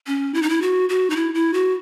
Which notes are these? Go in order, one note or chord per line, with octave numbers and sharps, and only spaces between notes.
C#4
E4
D#4
E4
F#4
F#4
D#4
E4
E4
F#4